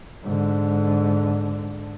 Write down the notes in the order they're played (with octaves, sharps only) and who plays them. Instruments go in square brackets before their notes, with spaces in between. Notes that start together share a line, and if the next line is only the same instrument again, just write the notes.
[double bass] G#2 D3